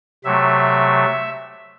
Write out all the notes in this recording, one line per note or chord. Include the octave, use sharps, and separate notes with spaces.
C3 F#3 A3 E5